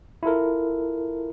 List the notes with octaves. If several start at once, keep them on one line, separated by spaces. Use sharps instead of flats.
E4 F4 A4 A#4